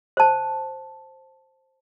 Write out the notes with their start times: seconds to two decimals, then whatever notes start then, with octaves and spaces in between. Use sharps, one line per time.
0.17 C5 A5